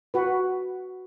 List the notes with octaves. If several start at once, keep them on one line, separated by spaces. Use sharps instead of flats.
F#4 B4